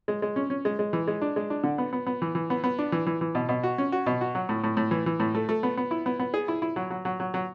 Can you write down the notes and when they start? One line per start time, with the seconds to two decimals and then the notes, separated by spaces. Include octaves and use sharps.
0.08 G#3
0.22 G#3
0.36 C#4
0.50 C#4
0.65 G#3
0.79 G#3
0.93 E3
1.07 G#3
1.21 D4
1.36 G#3
1.50 D4
1.64 D3
1.78 B3
1.93 B3
2.07 B3
2.22 E3
2.35 E3
2.50 B3
2.64 B3
2.79 D4
2.92 E3
3.07 E3
3.21 E3
3.35 B2
3.49 B2
3.63 F#4
3.78 C#4
3.92 F#4
4.06 B2
4.21 F#4
4.35 F#3
4.49 A2
4.64 A2
4.77 A2
4.91 E3
5.06 E3
5.20 A2
5.35 A3
5.49 A3
5.63 B3
5.77 B3
5.91 E4
6.06 B3
6.20 B3
6.34 G#4
6.48 E4
6.62 E4
6.76 F#3
6.90 F#3
7.05 F#3
7.20 F#3
7.34 F#3